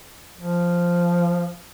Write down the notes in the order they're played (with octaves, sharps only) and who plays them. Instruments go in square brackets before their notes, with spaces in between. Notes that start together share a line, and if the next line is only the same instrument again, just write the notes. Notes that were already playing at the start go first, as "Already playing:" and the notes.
[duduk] F3